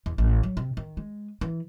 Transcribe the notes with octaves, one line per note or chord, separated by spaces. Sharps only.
E2
A1
F#3
C3
D#3
G#3
E3